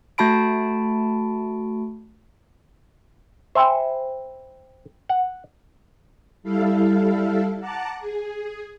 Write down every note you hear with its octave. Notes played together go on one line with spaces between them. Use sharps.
A3 F#4 A5 B5 D7
C5 E5 G5 G#5 B5 C6
F#5
G3 E4 A4 F5
F#5 A5 A#5 D6 F#6
G#4